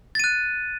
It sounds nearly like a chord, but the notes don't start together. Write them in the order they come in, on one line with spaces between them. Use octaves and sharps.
A6 D#7 F#6